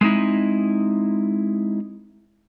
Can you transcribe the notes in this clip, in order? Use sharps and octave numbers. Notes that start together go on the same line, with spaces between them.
G#3 A3 C4 D#4 E4